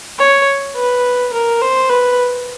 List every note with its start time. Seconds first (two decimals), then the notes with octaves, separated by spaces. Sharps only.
0.19 C#5
0.76 B4
1.33 A#4
1.62 C5
1.90 B4